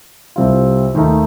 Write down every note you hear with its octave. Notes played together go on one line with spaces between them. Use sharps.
C2 C3 G3 C4 F4
D#2 D#3 A3 D#4